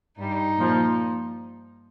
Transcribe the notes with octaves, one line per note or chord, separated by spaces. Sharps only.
G2 G3 D#4
A#2 F3